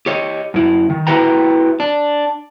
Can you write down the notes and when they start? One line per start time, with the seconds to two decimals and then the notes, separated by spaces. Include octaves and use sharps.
0.06 G4 C#5 D#5
0.54 F#2 E4
0.90 D#3
1.07 E4 F#4 G4 B4 G5 A#5
1.80 D4